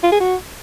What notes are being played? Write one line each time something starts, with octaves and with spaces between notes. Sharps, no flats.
F4
G#4
F#4